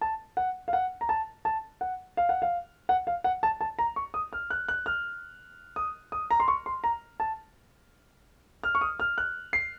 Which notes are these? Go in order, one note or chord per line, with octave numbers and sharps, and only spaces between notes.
A5
F#5
F5
F#5
A#5
A5
A5
F#5
F5
F#5
F5
F#5
F5
F#5
A5
A5
A#5
C#6
D#6
F6
F#6
F#6
F6
D#6
D#6
A#5
C6
C#6
C6
A#5
A5
F6
C#6
D#6
F6
F#6
C7